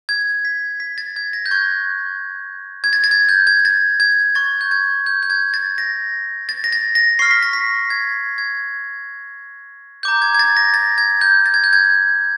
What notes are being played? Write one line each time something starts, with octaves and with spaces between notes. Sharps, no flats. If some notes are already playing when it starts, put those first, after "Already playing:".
G#6
B6
B6
A6
G#6
A#6
G6
C#6 F#6 G#6
G#6
A6
A6
G#6
G6
G#6
A6
G#6
C#6 F#6 A6
G6
G#6
G6
G6
G#6
A6
A#6
A6
A#6
A6
A#6
C#6 F6 C7
B6
A#6
B6
G#6
G#6
A#5 D6 G6
G#6
G#6
A6
A#6
A6
G#6
G6
A6
G#6
G6
G#6